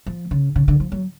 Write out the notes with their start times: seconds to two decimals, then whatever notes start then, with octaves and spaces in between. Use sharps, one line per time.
0.07 F3
0.31 C#3
0.56 C#3
0.68 D3
0.80 F3
0.92 F#3